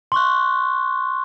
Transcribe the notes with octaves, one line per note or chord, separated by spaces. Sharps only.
C6 C#6 F#6